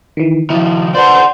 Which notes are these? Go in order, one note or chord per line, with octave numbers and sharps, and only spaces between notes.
D#3 E3
D#3 F3 E4
F4 B4 C5 D5 F#5